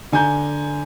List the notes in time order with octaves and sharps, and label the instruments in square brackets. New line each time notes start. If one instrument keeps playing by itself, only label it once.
[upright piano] D3 G#5 A#5 G6